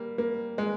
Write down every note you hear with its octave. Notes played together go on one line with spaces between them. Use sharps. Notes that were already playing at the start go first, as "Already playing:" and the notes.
Already playing: G3 A#3
A#3
G#3